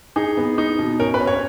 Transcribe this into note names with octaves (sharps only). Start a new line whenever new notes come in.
D#4 G#4
B3
D#4
B2
C#4 A#4
B4
C#4
C#5